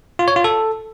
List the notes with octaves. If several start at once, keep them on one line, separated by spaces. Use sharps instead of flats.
F4
C#5
F4
A4